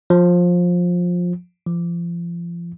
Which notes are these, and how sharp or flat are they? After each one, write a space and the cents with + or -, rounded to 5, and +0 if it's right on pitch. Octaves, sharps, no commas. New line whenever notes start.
F3 +20
F3 -30